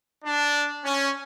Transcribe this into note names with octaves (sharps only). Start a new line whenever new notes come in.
D4
C#4